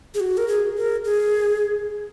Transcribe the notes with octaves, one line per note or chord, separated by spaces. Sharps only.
G#4
F#4
A#4
G#4
A#4
G#4